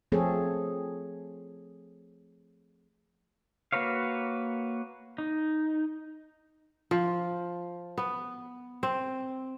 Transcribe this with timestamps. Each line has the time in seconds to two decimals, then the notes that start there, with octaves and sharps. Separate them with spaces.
0.12 F3 A3 C4 G#4 A4 C#5
3.72 A#3 F#4 B4 C#5 F5
5.18 D#4
6.91 F3
7.98 B3
8.83 C4